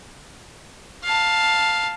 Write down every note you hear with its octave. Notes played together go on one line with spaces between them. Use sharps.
F5 A5